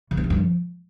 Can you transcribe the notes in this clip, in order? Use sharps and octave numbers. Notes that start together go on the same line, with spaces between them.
C#3
B3
C3
G2
F3